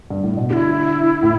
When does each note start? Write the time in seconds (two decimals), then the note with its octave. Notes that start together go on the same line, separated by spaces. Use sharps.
0.10 G2
0.24 A2
0.37 B2
0.49 D3 E4 G4
1.23 A2